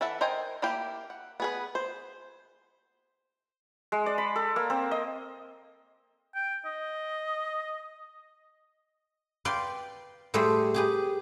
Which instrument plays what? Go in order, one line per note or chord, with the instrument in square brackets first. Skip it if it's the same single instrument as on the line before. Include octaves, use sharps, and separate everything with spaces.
[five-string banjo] E3 A4 B4 E5 F#5
A#4 C5 D#5 G5 G#5
A#3 E4 G4 F5 G5
F#5
B3 G#4 B4
C5
[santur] G#3
D5
B5
A4
A#3
C4
D#5
[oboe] G5
D#5
[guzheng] B4 D5 F5 G5 C6
A2 G3 A3 G#4 C5 B5
G4 G#4 B4